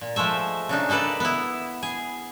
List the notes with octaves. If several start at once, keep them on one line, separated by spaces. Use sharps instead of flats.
A#2
F3 G#3 A3 E5
C#3 D4 D#4
A#3 D#4 A4 B4 D5
B3 E4
G#4